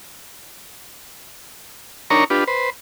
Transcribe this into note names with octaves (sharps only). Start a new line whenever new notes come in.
D4 D#4 A#4 C#5 A#5 C#6
D4 F4 G4 B4
B4 C5